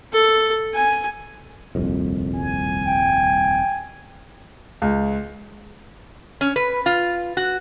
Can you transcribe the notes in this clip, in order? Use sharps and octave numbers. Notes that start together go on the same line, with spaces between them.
A4
G#5
D#1 C2 F2
G#5
G5
C#2
C#4
B4
F4
F#4